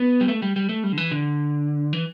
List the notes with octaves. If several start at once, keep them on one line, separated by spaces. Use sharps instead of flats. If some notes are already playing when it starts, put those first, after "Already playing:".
Already playing: B3
G3
A3
G3
G3
A3
G3
D3
E3
D3
E3